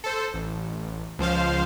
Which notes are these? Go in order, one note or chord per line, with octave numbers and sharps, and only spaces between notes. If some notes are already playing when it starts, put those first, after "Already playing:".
A4 C5
A1
C#2 F3 C5 F5